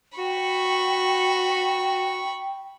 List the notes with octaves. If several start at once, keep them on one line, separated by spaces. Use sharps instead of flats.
F#4 G5 B5 C#6